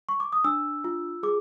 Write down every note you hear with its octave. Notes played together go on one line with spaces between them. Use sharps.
C#6
D6
D#6
D4 E6
F4
G#4 D6